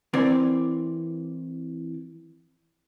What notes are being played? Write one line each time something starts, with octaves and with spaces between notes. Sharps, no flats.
E3 C4 A#4 D5